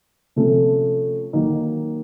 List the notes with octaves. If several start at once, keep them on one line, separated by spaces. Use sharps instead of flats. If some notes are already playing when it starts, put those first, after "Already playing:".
C3 F3 A3 C#4
D#3 F#3 A#3 D#4